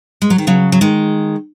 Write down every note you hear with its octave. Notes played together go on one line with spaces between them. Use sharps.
G#3
F#3
D#3
C#3 F#3
F#3
D#3 G#3